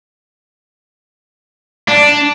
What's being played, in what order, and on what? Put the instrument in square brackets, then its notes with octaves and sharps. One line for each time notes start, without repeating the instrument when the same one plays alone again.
[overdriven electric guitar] D4